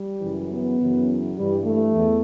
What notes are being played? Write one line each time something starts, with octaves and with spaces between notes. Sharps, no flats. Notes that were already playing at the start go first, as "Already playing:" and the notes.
Already playing: G3
F#2 C#3 E3
B3
F#2 C#3 E3
G2 E3 G3
A3
E2